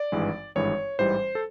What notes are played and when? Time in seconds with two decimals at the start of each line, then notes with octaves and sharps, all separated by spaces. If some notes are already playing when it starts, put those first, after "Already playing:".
Already playing: D5
0.12 G#1 G2 E3 G#3
0.55 G#1 G2 E3 G#3 C#5
0.99 A1 G#2 E3 G3 C5
1.35 A4